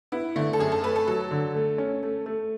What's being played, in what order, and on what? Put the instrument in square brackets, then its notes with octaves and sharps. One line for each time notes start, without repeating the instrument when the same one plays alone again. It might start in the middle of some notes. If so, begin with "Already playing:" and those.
[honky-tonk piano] B3 [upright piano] E4
[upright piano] D3 [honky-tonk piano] A3
[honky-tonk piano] A4
[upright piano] F#2 [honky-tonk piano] G#4
[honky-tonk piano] A4
[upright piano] A3 [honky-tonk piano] B4
[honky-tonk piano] A4
[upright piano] F#3 [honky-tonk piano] A4
[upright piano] D3
A3
C#4
A3
A3